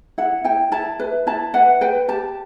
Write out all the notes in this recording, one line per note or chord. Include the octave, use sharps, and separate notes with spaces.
E4 F#5
E4 G5
E4 A5
B4
E4 A5
B4 F#5
B4 G5
G4 A5